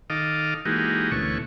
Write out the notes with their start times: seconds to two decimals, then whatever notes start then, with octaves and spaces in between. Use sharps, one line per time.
0.10 D#3 A4 D#5 F5 D6
0.65 E3 G#3 A#3 D#4 F#4 G4
1.12 D2 B2 E3 A3 C#4 C#6